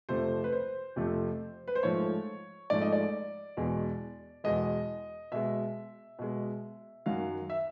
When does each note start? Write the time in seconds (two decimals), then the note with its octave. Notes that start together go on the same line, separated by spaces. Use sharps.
0.09 F2 C3 F3 A3 C5
0.44 B4
0.52 C5
0.96 F2 C3 F3 A3
1.68 B4
1.75 C5
1.83 G#2 F3 A3 C#5
2.70 G#2 F3 A3 D5
2.82 D#5
2.92 D5
3.57 E2 B2 G#3
4.44 E2 B2 G#3 D#5
5.32 B2 G#3 E5
6.19 B2 G#3
7.06 F#2 D#3 F#3 F5
7.50 E5